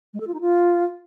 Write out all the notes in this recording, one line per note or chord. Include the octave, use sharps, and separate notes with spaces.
G#3
A4
F4
D#4
F4